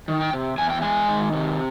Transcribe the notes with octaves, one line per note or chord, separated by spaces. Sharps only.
D#3
G5
C3
E2 G#5
G5
G#3 G#5
D#3
C3